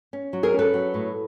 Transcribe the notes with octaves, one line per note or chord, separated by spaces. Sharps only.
C#4
F#3
G#4 A#4
C#4
A4 B4
F#3
A2